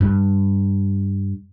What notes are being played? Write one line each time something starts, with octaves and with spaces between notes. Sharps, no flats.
G2